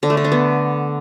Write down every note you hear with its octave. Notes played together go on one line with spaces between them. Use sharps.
D3
A3
D3
D4
B3